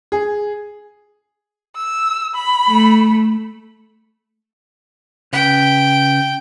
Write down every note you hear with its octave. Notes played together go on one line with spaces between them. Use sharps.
G#4
E6
B5
A3
C#3 B4 G5